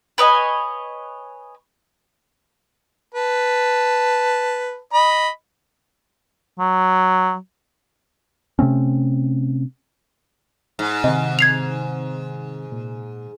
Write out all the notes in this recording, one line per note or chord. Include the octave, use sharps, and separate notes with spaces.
B4 C#5 D#5 G#5
B4 A5
D#5 B5
F#3
C3 A3 C4 C#4
G#2
C3 D#3 C4 D#5
G#6 C7 F7
A#2